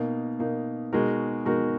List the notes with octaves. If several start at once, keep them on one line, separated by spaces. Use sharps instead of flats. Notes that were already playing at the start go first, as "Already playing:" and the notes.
Already playing: B2 A#3 D#4
B2 A#3 D#4
B2 G#3 D#4 F#4 A#4
B2 G#3 D#4 F#4 A#4